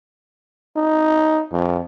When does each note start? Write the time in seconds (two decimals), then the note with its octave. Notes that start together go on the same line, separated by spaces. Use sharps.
0.76 D#4
1.52 F2